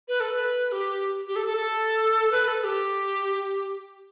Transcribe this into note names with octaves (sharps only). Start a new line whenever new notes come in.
B4
A4
B4
G4
G4
A4
A4
A4
B4
A4
G4